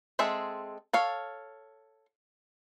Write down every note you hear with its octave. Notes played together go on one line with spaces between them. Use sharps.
G#3 C4 G#4 A4 E5
A4 C#5 F5